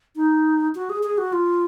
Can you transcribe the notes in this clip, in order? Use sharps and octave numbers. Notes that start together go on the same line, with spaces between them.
D#4
F#4
G#4
G#4
F#4
F4